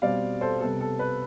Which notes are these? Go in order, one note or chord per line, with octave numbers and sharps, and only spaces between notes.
B2 G3 C4 D5 F5
A4 C5
C3 G3 B3 A4
A4
B4